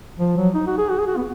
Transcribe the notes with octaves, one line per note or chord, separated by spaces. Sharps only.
F3
F#3
D#4
F#4
G#4
F#4
G#4
F#4
B3